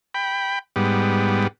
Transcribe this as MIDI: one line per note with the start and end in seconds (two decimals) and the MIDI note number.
0.14 0.59 79
0.14 0.59 83
0.76 1.47 44
0.76 1.47 55
0.76 1.47 59